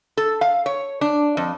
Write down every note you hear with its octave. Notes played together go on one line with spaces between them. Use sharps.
A4
F5
C#5
D4
F2